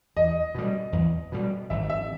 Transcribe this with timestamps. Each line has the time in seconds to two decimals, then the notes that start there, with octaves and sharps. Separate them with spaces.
0.16 E2 D#5
0.55 B2 G3
0.93 E2
1.32 B2 G3
1.70 G#1 E5
1.90 E5